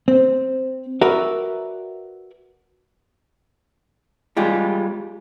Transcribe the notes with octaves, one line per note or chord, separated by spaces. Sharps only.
C4
F#4 A#4 B4 D5 E5
G3 G#3 F4 G4